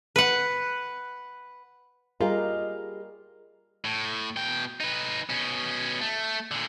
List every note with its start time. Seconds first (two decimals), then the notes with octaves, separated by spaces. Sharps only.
0.16 B4 F#5
2.21 G3 F4 G4 G#4 A#4 D#5
3.85 A2
4.37 B2 G5
4.80 D#4 B4
5.29 B2 C#4
6.01 A3
6.51 A#2 D3